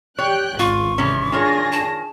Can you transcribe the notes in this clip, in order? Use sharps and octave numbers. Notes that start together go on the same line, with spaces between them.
G4 C#5 G5 F#6
G#1 C#2 F4 C#6
C3 E3 C#4
D#3 D4 F4 G#4 C#5 A#6
A5